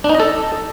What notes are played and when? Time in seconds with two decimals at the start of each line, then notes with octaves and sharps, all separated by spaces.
0.04 D4
0.09 D#4
0.15 D#5
0.20 A4